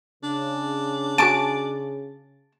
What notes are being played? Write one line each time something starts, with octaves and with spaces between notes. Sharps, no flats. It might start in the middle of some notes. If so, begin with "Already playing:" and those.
C#3 D4
F#4 G#5 A5 D6 D7